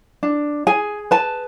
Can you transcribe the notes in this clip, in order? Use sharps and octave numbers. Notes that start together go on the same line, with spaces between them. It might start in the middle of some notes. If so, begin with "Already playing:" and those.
D4
G#4 G#5
B4 A5